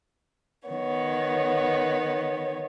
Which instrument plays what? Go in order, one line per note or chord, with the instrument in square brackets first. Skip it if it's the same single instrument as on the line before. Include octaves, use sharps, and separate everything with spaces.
[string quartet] D#3 B3 C#5